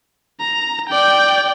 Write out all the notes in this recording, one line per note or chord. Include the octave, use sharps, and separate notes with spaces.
A#5
D5 G5